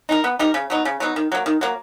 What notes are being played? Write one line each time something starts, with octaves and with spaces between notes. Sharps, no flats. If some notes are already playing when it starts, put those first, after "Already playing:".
D#4 G4 A#4
B3
D#4 G4 A#4
C#3
F#3 B3 D#4
C#3
F#3 B3 D#4
D#3
F#3 A#3
D#3
F#3 A#3